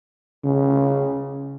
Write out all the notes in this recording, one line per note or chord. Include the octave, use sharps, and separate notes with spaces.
C#3